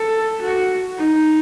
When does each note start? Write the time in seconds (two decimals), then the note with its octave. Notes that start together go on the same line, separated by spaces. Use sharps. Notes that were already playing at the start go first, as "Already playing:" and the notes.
Already playing: A4
0.42 F#4
0.98 D#4